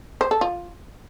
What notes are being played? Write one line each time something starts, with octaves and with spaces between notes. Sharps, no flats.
C5
A4
F4